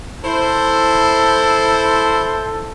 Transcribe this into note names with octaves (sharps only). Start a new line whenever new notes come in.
E4 A4 C5